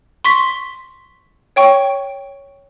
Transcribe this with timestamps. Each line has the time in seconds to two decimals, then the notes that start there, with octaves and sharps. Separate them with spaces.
0.25 C6 C#6 B6
1.56 C#5 G5 C#6